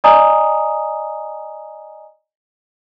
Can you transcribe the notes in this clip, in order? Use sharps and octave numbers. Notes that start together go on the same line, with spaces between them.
D5 D#5 G#5 A#5 D#6